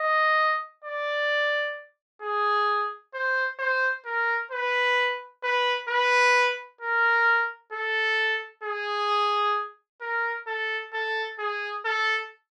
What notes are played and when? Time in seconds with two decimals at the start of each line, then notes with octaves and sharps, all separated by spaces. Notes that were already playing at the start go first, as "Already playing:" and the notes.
Already playing: D#5
0.84 D5
2.22 G#4
3.14 C5
3.59 C5
4.05 A#4
4.51 B4
5.43 B4
5.89 B4
6.81 A#4
7.72 A4
8.63 G#4
10.01 A#4
10.47 A4
10.93 A4
11.39 G#4
11.85 A4